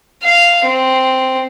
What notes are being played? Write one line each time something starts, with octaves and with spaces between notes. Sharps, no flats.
F5
C4